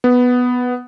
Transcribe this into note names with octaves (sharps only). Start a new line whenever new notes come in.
B3